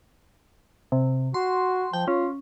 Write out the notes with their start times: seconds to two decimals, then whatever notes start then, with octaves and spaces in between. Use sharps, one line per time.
0.92 C3
1.34 F#4 C6
1.93 F3 G5
2.08 C#4 F4